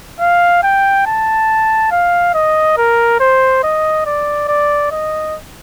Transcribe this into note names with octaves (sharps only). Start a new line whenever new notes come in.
F5
G5
A5
F5
D#5
A#4
C5
D#5
D5
D5
D#5